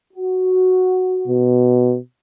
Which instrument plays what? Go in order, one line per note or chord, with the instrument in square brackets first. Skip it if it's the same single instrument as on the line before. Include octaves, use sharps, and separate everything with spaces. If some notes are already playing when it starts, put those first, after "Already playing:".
[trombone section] F#4
[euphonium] B2